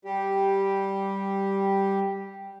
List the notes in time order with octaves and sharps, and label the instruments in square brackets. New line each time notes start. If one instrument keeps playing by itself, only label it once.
[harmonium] G3 G4